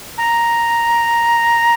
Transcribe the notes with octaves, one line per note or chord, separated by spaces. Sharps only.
A#5